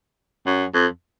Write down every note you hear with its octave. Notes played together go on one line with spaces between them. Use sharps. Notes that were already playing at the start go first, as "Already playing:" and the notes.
F#2
F2